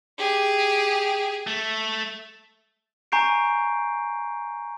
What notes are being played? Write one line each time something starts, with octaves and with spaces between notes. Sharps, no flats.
G4 G#4
A3
G#5 A#5 C#6 G6 C7 D7